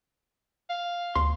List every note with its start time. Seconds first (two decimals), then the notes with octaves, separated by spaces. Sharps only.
0.70 F5
1.15 D2 C6